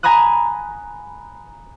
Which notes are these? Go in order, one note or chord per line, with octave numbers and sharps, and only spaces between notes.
G#5 A#5 B5 D#6 F#6